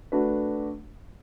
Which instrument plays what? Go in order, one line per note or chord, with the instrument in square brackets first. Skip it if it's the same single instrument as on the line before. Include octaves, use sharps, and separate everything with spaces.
[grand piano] A3 D4 F#4 B4